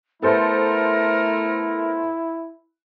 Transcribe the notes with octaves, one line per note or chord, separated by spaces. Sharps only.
A3 B3 E4 A4 A#4 C5